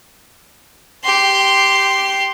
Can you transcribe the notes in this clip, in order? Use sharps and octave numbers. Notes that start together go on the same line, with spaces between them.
G4 C6